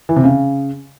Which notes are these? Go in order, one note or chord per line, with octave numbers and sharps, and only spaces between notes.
E3
C3
C#3